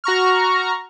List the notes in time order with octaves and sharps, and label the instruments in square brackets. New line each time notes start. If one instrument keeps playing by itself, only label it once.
[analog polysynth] F#4 A#5 C#6 F6